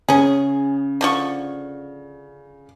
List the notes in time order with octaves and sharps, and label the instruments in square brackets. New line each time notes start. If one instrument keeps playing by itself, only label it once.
[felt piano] C#3 [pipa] C#4 G#4
[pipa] D3 F3 C#6